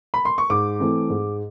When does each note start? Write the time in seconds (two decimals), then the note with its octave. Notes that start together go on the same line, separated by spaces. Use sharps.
0.14 B5
0.25 C6
0.38 C#6
0.50 G#2 D6
0.80 E3 A3 C4
1.10 G#2